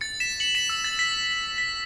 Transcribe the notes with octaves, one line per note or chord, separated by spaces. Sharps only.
A6 C#7
B6 E7
C#7 F#7
B6 E7
E6
A6
B6
B6